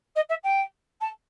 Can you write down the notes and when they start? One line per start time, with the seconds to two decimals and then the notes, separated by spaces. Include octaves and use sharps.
0.15 D#5
0.29 E5
0.43 G5
1.01 A5